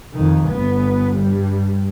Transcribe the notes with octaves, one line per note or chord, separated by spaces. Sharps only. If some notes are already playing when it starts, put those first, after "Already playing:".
F2 D#3
G1 B3
G2 G3